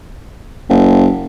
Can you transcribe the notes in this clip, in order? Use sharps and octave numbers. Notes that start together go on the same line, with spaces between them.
F#1